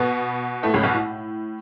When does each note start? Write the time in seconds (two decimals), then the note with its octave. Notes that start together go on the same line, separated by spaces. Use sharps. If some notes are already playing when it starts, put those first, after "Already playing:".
Already playing: B2 B3
0.63 A2 A3
0.74 C#2 C#3
0.83 B1 B2
0.94 A2